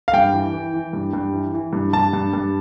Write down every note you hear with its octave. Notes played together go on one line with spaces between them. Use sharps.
F5
G2 G5
E3
E3
E3
G2
G2
E3
E3
G2
G2 A5
G2
G2